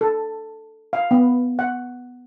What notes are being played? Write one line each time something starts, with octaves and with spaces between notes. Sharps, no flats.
A4
F5
B3
F#5